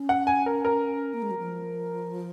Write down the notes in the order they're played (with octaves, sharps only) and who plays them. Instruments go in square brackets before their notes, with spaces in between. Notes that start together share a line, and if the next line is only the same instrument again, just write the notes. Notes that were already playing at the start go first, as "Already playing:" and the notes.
Already playing: [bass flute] C#4
[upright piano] F#5
G#5
A#4
A#4
[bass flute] A#3
G#3
F#3
F3